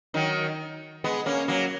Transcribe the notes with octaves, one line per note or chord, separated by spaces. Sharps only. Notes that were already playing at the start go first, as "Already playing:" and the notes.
D#3 F#3
G#3 B3
A#3 C#4
F#3 A#3